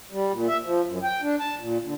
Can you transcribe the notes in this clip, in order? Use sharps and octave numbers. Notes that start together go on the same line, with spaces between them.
G3
A#2
E5
F3
F#2
G5
D4
A5
A#2
D3